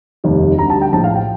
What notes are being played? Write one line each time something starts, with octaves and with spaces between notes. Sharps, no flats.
F1 D#2 D#3 G3
D2 D3 G3 A#5
A5
G5
A#1 A2 F3 A5
F5
G5